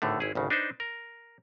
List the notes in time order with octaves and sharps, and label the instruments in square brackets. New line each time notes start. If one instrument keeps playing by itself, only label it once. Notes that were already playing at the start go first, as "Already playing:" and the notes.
[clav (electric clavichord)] G#1 A2 D3 A3
G#1 E4 G#4
G#1 D2 C#3
D4 D#4 B4 C5
A#4